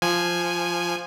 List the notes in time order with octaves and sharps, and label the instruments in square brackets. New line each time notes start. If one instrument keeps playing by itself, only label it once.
[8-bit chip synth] F3 G#5